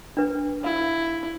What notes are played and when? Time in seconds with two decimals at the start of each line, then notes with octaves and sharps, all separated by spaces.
0.17 D4 B4
0.64 E4 F5